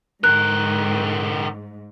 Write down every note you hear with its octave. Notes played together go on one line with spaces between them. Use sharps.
G#2 D3 A#4 F#6